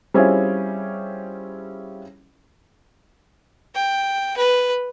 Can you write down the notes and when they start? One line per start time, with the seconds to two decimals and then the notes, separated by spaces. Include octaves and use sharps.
0.14 G3 C4 C#4 E4 F4 G#4
3.75 G5
4.37 B4